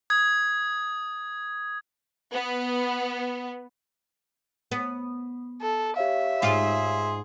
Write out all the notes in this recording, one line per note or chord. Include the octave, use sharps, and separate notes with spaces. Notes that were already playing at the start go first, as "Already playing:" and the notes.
D#6 G#6
B3
B3
A4
G4 C#5 E5 F5
G#2 F4 G#4 C6